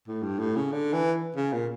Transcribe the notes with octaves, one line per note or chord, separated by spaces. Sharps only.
A2
G2
A2
C#3
D3
E3
C#3
A#2